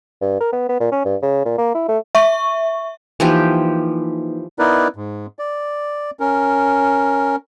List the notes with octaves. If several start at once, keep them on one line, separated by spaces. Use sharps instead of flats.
G2
A#4
B3
B3
A#2
C#4
G2
C#3
A#2
A#3
E4
A3
E5 C#6
E3 F3 A#3 D#4 G4 B4
B3 D#4 E4 A#4 B4 D5
G#2
D5
C#4 A#4